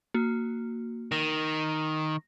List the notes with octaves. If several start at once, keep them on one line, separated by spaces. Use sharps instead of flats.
A#3 F#4
D#3 A#6